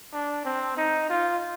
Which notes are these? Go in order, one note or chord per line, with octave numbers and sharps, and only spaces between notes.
D4
C4
D#4
F4